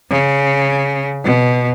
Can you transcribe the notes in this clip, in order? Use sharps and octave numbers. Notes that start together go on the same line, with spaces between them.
C#3
B2